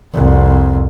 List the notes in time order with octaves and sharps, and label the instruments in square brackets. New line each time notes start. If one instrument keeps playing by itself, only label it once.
[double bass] C2 F2